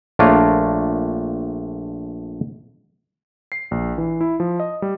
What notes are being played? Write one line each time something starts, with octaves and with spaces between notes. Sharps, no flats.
A#1 A3 D4 F4 A#4 C#5
C7
A#1
E3
E4
F3
D#5
G3